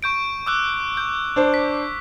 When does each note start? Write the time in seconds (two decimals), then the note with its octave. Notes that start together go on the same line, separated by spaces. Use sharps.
0.03 C#6 G6 D7
0.46 D6 E6 F#6
0.97 G6
1.36 D4 C5
1.54 B6